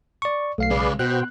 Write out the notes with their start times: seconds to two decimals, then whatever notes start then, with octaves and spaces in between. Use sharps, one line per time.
0.22 D5 C#6
0.58 B1 A3 F5 C7
0.71 C#3 G#3 G#4 B4 D5
0.99 B2 F#4 C5 G5 F#6